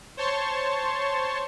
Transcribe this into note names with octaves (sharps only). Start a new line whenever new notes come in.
C5 C#5 A5 C6 C#6